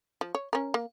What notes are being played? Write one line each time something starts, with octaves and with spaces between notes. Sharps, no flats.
F3
C#5
C#4 A#4
A#3